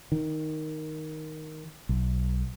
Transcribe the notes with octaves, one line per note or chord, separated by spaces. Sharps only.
D#3
B1